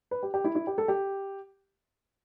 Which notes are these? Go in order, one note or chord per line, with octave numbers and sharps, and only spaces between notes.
B4
G4
G4
E4
E4
G4
A4
G4